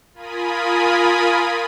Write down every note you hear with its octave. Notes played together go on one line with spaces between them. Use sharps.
F4 A#4 G#5 B5 D#6